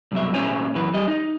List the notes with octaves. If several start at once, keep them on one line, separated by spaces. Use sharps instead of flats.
C2 F#2 B2 E5
A#2 A3 C#4 C5 C#5 G#5
F#2 E3 B4
G3 D#5
D#4